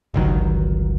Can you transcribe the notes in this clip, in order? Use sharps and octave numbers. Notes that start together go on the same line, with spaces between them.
G1 C#2 D#3 F#3